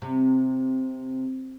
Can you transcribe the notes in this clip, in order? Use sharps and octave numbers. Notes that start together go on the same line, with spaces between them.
C3